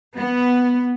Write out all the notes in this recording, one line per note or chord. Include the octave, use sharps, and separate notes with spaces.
B3